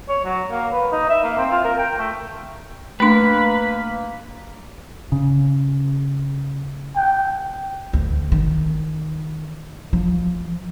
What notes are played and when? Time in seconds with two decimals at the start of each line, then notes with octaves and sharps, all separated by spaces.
0.09 C#5
0.25 F#3
0.51 A#3
0.72 B4
0.92 D#4
1.09 E5
1.23 A#3
1.38 C4
1.52 F4
1.64 A#4
1.78 G5
1.98 A3
3.00 A3 A#3 D4 B4
5.12 C#3
6.96 G5
7.93 D2
8.32 D#3
9.93 F3